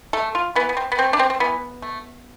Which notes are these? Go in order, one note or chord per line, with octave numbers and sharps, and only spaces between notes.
A3 A4
F4
E3 B3
B3
C4
B3
A3 C4
D4
C4
C4
E3 B3
A3